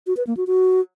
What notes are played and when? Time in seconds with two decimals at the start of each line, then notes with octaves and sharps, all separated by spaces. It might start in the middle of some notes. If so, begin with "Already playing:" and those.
0.07 F#4
0.17 B4
0.27 A#3
0.37 F#4
0.47 F#4